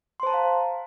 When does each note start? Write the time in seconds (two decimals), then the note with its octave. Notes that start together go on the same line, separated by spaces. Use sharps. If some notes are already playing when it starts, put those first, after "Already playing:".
0.20 C6
0.23 C5
0.27 A5
0.30 A#5
0.34 F5